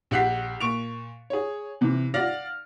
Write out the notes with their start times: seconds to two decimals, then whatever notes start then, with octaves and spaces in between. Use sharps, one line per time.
0.11 A#1 G4 F#5 F#6 B6 C7
0.60 A#2 C#6 D7 F7
1.30 G#4 C#5
1.81 C3 E3
2.14 D5 F5 F#5 F6 A#6